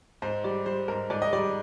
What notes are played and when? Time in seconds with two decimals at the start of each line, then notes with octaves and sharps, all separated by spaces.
0.22 G#2 C5
0.44 G3 D5
0.66 G3 C5
0.88 G#2 A#4
1.10 G#2 D5
1.22 D#5
1.33 G3 D5